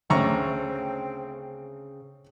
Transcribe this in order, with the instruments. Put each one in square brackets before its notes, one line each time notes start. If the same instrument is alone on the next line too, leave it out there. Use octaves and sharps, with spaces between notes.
[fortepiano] D2 A#5 C#6 [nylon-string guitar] C#3 [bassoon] C4